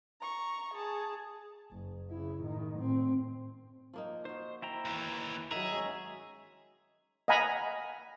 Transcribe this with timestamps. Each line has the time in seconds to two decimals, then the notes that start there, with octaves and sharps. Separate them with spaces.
0.21 A#5 C#6
0.74 G#4 A5
1.72 F#1
2.10 C#3 E4
2.41 A2 D#3
2.78 A2 C4
3.93 F3 A#3 D#4
4.25 D#4 F#4 C5
4.62 E4 G5 A#5
4.85 D#2 E3
5.51 D#3 F#3 G#4 E5 A#5
5.72 G#3 C#4
7.28 D#5 F5 F#5 G#5 A#5 B5